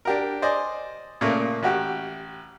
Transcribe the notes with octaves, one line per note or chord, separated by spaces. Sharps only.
D4 G4 A#4
C5 D5 D#5 G#5
A#2 C#3 A3 A#3
A1 F#4 G4